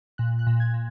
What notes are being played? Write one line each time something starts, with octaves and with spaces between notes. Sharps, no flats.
A#2 F#6
F#6
A#2
G#6
A#2